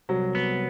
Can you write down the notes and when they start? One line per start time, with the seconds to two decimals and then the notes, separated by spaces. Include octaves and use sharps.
0.09 C2 F#3
0.35 B3